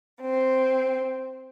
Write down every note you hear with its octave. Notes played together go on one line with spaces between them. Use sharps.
C4